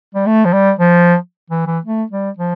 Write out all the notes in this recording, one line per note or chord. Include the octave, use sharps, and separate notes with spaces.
G3
A3
F3
G3
F3
E3
E3
A3
G3
F3